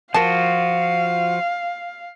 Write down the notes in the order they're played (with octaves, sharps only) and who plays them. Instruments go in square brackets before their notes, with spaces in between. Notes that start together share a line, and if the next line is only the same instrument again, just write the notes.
[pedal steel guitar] F3 F4 F#4 [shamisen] A#4 A5 [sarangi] F5